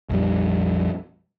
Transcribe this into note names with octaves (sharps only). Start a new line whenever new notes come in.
A#1 F2 G3